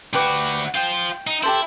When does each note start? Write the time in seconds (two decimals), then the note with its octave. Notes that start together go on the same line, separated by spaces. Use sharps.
0.13 D2 F#4 G4 B4 D6
0.75 F4 C5 G5
1.27 D#4
1.43 E4 G4 A4 C5